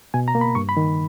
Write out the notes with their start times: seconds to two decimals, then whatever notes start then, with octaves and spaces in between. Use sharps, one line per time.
0.14 B2 G#5
0.28 A#5
0.35 A#3
0.41 B5
0.55 G2 C#6
0.69 B5
0.77 D#3